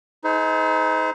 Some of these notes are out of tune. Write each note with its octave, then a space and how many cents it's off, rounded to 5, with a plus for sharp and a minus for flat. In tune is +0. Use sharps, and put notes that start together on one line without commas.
D#4 +25 G#4 +45 C5 -35